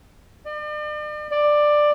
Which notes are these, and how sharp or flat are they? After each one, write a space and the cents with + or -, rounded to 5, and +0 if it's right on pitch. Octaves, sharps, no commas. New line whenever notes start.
D5 +40
D5 +10